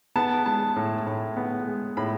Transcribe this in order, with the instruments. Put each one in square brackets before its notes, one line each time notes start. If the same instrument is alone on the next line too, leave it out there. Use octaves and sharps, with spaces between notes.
[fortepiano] B3 A5
G#3 A5
A2
A2
B3
G#3
A2 B5